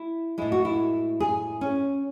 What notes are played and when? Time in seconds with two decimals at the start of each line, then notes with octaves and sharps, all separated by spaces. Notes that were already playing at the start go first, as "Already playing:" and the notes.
Already playing: E4
0.38 A2 G#3 E4
0.52 F#4
0.65 E4
1.20 G#4
1.61 C#4